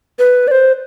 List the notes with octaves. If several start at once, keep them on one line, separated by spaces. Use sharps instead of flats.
B4
D5
C5